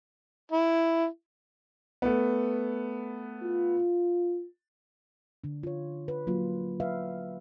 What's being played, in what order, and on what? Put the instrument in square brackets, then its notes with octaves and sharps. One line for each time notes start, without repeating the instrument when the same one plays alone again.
[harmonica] E4
[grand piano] A3 B3
[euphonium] F4
[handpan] D3 D4
F4 C#5
B4
F#3 A#3 F4
B4 E5 F5